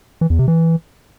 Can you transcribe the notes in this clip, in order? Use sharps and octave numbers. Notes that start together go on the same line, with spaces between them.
E3
E2
C3
E3